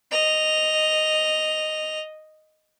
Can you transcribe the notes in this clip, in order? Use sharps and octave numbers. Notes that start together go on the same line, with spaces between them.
D#5 F7